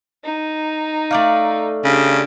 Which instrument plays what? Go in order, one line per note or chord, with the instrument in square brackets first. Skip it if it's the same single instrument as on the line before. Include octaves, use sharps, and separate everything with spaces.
[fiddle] D#4
[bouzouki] A3 D5 F5
[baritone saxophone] C#3 [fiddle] D4 G4